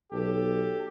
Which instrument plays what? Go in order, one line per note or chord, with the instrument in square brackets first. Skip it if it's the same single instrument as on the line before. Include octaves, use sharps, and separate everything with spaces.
[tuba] B1 [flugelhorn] G4 [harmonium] A4